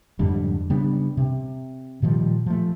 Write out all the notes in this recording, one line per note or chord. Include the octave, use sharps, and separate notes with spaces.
F2 G#2 D3 G3
C#3 G3 B3 D4
C3
A#2 D#3 F3 G3
F3 A3